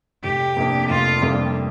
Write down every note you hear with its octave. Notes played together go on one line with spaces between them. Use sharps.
F1 G4
F2 C3 A#3 D4
F1 F4
F2 C3 G3 A#3 D4